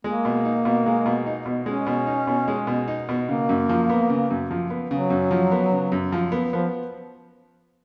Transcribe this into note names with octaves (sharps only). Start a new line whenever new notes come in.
G#3 A#3
B2
D#4
B2
G#3
B2
D#4
B2
G#3 C#4
B2
D#4
B2
G#3
B2
D#4
B2
C#3 A#3
F#2
F3
B3
C#3
F#2
F3
B3
C#3 F#3
F#2
F3
B3
C#3
F#2
F3
B3
F3 B3